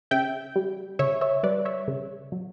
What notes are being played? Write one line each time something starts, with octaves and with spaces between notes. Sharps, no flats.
C#3 E5 G5
G3
C#3 C#5 E5
C#5 E5
G3 B4 D5
C#5 E5
C#3
F#3